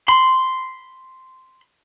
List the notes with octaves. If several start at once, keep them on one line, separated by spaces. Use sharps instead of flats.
B5 C6